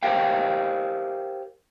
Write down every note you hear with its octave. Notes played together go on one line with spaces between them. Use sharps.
G4 A#4 C5 F5 G5